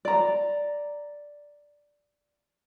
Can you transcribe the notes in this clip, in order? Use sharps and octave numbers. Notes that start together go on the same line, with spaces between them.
D5 A#5